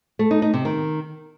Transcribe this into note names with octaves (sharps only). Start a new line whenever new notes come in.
A3
D#4
D#4
C3
D#3